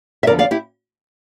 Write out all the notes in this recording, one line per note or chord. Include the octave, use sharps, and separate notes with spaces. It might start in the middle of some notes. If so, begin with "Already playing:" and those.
E5
E2 D3 F3 A#4 D5
D5 F5
E4 G4